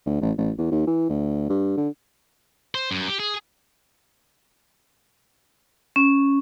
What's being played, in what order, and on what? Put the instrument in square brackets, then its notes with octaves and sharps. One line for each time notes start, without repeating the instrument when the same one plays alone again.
[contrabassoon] D2
A1
A1
E2
D#2
E3
D2
G2
D3
[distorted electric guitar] C5
F#2
G4
G#4
[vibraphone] C#4